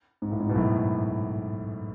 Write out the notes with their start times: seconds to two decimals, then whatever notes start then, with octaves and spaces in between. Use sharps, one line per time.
0.22 G#2
0.32 A2
0.40 G#2
0.49 B2
0.55 F#2 A2